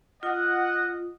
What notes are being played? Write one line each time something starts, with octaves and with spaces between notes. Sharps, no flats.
F4 D#5 F#5